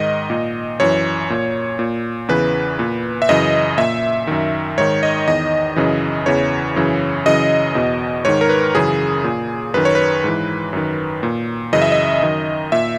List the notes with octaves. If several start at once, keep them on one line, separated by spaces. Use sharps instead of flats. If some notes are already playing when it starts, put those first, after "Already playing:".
Already playing: G#2 D#3 D#5
A#2
F#2 E3 C#5
A#2
A#2
E2 C#3 E3 B4
A#2
E5
F#2 C#3 E3 D#5
A#2 E5
F#2 D#3
G#2 D#3 C#5
D#5
E2 D#3 D#5
F#2 C#3 E3
E2 C#3 E3 C#5
F#2 C#3 E3
F#2 C#3 E3 D#5
E2 B2
G#2 D#3 C#5
A#4
B4
F#2 C#3 E3 G#4
A#2
F#2 D#3 B4
C#5
B4
G#2 E3
F#2 D#3
A#2
F#2 C#3 E3 D#5
E5
D#5
F#2 D#3
A#2 E5